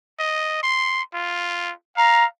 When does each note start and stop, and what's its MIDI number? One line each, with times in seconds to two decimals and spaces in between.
0.19 0.60 75
0.63 1.02 84
1.14 1.72 65
1.97 2.27 77
1.97 2.24 82